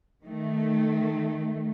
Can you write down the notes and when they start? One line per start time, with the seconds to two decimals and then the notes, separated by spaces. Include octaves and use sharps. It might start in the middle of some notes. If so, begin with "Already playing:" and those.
0.23 D#3 A3